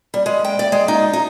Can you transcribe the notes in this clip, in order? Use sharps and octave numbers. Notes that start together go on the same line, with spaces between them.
G3
G#3
G5
D5
G#3
D#4
D#4